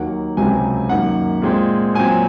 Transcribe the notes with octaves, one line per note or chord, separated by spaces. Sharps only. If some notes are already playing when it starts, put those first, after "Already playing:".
Already playing: D#2 D#3 F#3 A#3 F#5
C#2 C3 F#3 C4 G#5
F#2 D#3 A#3 F#5
A#2 G#3 C4
A#2 F#3 C4 G#5